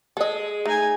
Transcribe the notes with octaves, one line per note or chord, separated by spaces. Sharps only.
G#3 A4 D#5
A3 D#4 G#5